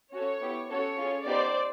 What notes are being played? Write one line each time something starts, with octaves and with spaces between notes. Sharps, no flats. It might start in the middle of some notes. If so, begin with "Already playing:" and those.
C#4 F#4 A4 C#5
B3 E4 G4
C#4 F#4 A4 C#5
C#4 F4 G#4
B3 D#4 G4 C5 D5